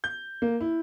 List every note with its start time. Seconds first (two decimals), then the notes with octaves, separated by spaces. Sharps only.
0.04 G6
0.42 A#3
0.61 E4